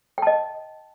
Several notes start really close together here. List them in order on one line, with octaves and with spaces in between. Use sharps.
G5 A5 D#5